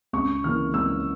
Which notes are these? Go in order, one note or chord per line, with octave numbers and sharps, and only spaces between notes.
C#2 C#6
C#3 E3 A#3 F6
C#2 E6